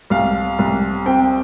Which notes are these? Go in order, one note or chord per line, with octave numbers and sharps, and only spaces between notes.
C2 F5
C2
C4 G5